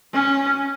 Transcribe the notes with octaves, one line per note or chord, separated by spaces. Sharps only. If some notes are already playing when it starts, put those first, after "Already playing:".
C#4